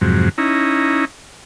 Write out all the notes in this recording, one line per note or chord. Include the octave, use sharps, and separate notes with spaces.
F2 G#2 C3 F#3
C#4 D#4 E4 A#5